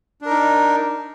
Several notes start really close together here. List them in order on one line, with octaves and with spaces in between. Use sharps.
D4 A#4 D#4